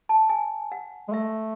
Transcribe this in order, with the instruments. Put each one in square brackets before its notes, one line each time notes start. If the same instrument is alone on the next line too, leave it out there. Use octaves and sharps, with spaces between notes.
[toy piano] A5
G#5
F#5
[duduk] G#3
[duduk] A3 [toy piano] E5